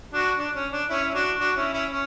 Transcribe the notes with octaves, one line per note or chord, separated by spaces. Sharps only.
D4 F#4
D4
C#4
D4
C#4 E4
E4
D4 F#4
D4 F#4
C#4 E4
C#4 E4
C#4